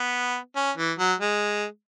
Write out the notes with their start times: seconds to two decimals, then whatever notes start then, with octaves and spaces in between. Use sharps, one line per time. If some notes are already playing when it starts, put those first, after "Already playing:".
Already playing: B3
0.56 C#4
0.78 E3
0.99 F#3
1.20 G#3